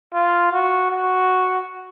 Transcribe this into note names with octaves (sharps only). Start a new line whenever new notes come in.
F4
F#4
F#4